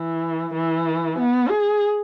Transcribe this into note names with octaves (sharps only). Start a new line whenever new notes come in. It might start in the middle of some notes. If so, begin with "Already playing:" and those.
Already playing: E3
E3
B3
G#4